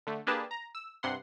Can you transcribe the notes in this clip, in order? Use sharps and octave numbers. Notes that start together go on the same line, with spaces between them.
D3 A3
A#3 D4 G4 G#4 B4 A5
A#5
E6
G2 C3 F#5 C6